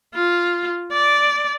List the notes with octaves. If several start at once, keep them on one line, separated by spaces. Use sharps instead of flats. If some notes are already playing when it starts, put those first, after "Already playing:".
F4
D5